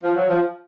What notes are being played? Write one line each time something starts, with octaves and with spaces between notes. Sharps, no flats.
F3
F#3
F3